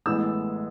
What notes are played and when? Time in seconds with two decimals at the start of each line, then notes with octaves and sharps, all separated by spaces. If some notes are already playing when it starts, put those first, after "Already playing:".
0.06 A1 A2 E3 G#3 B3 E6